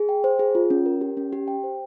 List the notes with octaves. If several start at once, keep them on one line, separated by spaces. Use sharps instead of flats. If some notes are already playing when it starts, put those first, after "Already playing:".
Already playing: G#4
G5
C5
G#4
F4
C#4
A#4
G4
C#4
G4
G5
C5